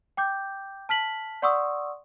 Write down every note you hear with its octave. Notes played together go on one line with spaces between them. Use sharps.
G5 D6 G6
A5 F6 B6 F#7
D5 F#5 C6 C#6 D#6 E6